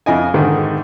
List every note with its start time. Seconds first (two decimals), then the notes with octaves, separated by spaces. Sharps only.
0.06 F2 E4 D#5 G#5
0.34 G#2 D3 D#3